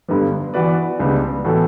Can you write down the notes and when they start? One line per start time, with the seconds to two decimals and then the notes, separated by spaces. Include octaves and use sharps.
0.08 G2 D3 G3 B3
0.54 E3 B3 F#4 B4 D5
0.99 C#2 C#3 G3 B3 D4
1.45 A2 E3 B3 F#4 A4